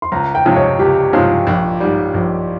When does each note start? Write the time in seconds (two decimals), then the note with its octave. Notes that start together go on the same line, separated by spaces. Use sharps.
0.02 C6
0.12 C#2 A#5
0.35 G5
0.46 C3 F3 G#3 C#4
0.52 D#5
0.56 C#5
0.79 C#2 G4
1.13 C3 F3 G#3 C#4 F4
1.47 A#1
1.80 G#2 G3
2.14 A#1